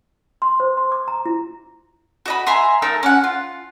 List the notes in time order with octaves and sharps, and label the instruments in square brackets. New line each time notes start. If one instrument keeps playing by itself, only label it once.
[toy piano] C6
C5
C6
D6
A#5
E4
[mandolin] F#4 D#5 B5
E5 G#5 A#5 C6
A3 D#4 A#4 E6
C#4 F#5
F4